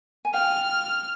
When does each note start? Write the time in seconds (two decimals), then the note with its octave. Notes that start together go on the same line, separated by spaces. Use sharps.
0.25 G#5
0.33 F5 G5 F6